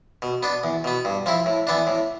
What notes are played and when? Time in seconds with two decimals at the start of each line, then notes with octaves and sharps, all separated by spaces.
0.22 B2
0.43 B3 D4
0.64 E2
0.84 B2 B3
1.05 G2
1.26 F3 C4 E4
1.46 A2
1.67 E3 B3 D4
1.87 A2